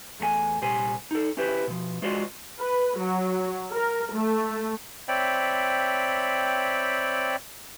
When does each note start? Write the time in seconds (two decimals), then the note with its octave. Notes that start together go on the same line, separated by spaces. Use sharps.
0.19 E2 A3 G#4 G#5
0.61 C2 A#2 G3 C5 G#5
1.11 D#4 A4
1.37 C#4 E4 G4 B4 C5
1.67 B2 F3
2.02 G#3 F4 F#4 C5 D5 D#5
2.59 B4
2.99 F#3
3.73 A#4
4.14 A3
5.08 C4 C#5 D5 E5 G5 B5